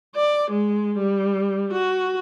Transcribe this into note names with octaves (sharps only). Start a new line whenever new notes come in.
D5
G#3
G3
F#4